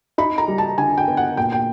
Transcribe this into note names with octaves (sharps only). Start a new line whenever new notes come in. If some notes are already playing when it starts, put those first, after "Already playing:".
D#4 B5
A#5
G3
A5
D3 G#5
G5
B3
F#5
A#2 G5
G5